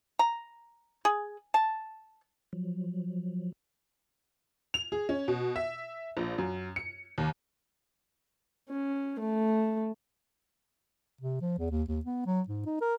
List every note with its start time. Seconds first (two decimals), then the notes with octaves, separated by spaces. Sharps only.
0.19 A#5
1.05 G#4
1.54 A5
2.53 F3 F#3
4.74 F7
4.92 G#4
5.09 C#4
5.28 B2
5.56 E5
6.17 A#1
6.38 F#2
6.76 C#7
7.18 D#2
8.70 C#4
9.20 A3
11.21 C3
11.41 F3
11.59 E2
11.71 D#2
11.88 D#2
12.05 B3
12.26 F#3
12.48 G#2
12.66 D#4
12.81 A#4